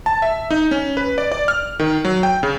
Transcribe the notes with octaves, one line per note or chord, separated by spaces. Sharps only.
A5
E5
D#4
C#4
B4
D5
D5
F6
D#3
F#3
G5
C#3